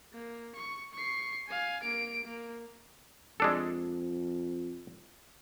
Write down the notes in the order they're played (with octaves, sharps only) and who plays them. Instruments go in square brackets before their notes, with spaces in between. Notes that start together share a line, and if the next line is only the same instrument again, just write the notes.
[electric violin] A#3
C#6
C#6 C7
F5 G#5
A#3 D7
A#3
[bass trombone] F2 [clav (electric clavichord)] G#3 D4 A4